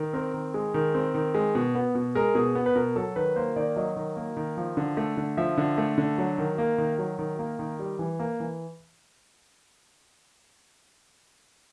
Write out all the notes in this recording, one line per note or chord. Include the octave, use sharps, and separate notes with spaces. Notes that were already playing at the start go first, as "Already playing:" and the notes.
Already playing: D#3
C4 A#4
D#3
G#3
D#3
C4
D#3
G#3
B2
B3
B2
G#3 A#4
B2 G#4
B3
B4
B2 A#4
F#3 A4
D#3 B4
A#3 C5
D#3 D5
F#3 D#5
D#3
A#3
D#3
F3
D3
A3
D3
F3 E5
D3
A3
D3
F#3
D#3
A#3
D#3
F#3
D#3
A#3
D#3
G3
E3
A#3
E3